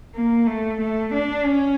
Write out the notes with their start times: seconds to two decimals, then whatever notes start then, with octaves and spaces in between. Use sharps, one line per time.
0.15 A#3
0.47 A3
0.80 A3
1.14 D4
1.46 C#4